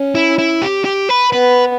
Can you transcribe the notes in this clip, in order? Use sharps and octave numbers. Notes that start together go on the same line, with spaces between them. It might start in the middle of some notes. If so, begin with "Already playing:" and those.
Already playing: C#4
E4
E4
G4
G4
B4
B3 B4